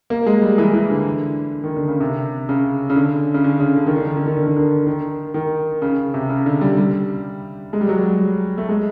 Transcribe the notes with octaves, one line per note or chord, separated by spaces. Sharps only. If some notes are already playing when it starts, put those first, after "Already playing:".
A#3
G#3
G3
E3
E3
D3
D#3
D3
C#3
C3
C#3
C#3
D3
C#3
D3
C#3
D3
D#3
D3
D#3
D3
D#3
D3
D#3
D3
D#3
D#3
C#3
C3
C#3
D3
G3
G3
G#3
G3
F#3
G3
A3
G#3